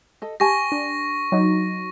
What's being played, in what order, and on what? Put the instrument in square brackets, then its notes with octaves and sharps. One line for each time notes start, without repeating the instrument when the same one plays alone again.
[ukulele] A4 D#5
[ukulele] G4 G#5 A5 [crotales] C#6 A#6
[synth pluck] D4
F#3 D#4